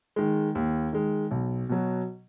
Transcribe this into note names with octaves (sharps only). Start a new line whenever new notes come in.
D#3 G#3
D#2
D#3 G#3
B1
B2 F#3